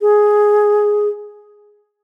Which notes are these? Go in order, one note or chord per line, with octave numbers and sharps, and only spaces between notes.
G#4